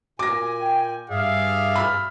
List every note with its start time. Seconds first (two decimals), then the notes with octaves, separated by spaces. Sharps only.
0.19 A#2 G#5 D6 A#6
0.60 G5
1.10 G2 G#4 D5 E5 F5
1.76 B5 E6 F6